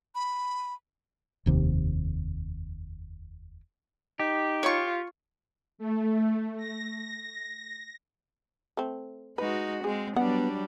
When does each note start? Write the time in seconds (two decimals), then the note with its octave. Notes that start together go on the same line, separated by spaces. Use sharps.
0.15 B5
1.46 F1 D#2 C3
4.20 D#4 G4
4.63 F4 C#5 C#6
5.78 A3
6.58 A#6
8.77 A3 C4
9.38 G#3 D#4 F#4 B4
9.84 G#3 C4 G#4
10.16 F#3 G3 B3 D4 F#5